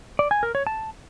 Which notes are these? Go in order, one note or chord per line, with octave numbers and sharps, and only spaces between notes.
D5
G#5
A#4
C#5
A5